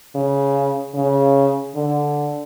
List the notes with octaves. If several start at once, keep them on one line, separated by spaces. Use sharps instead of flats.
C#3
C#3
D3